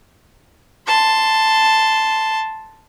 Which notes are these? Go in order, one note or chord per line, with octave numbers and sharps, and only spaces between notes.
A5 C6